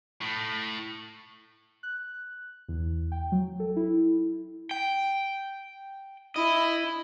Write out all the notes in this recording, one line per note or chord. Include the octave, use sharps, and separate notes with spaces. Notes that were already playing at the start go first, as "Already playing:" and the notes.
A2
F#6
E2
G5
F#3
A4
E4
G5
E4 D#5